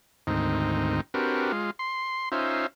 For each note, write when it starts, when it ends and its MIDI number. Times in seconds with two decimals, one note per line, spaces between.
0.27 1.01 38
0.27 1.01 44
0.27 1.01 51
0.27 1.01 60
0.27 1.01 63
1.14 1.52 60
1.14 1.52 62
1.14 1.52 66
1.14 1.52 67
1.14 1.52 70
1.14 1.52 71
1.52 1.71 56
1.52 1.71 65
1.79 2.29 84
2.32 2.67 61
2.32 2.67 63
2.32 2.67 65
2.32 2.67 72
2.32 2.67 76